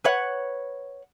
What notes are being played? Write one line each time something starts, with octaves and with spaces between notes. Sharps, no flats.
B4 C#5 F#5